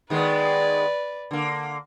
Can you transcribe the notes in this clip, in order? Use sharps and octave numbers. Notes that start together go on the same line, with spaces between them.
D#3 G#3 B3 B4 D5
D3 A#3